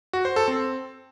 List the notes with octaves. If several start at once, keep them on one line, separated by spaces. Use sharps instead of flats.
F#4
C5
A4
C4